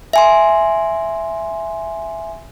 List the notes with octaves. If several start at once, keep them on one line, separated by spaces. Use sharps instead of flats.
E5 G#5 C6